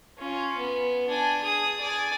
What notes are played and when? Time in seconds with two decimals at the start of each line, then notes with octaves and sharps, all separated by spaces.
0.19 C#4 F4
0.58 B3
1.09 D4 G#5
1.43 G#4 D#6
1.81 D5 G#5